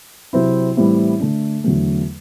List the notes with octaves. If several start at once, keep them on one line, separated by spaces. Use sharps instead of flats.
C3 F#3 C4 E4
A2 E3 G3 C4 E4
D3 A3 D4
E2 D3 F#3 A3